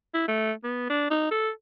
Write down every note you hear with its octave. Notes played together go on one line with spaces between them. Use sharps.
E4
A3
B3
D4
D#4
A4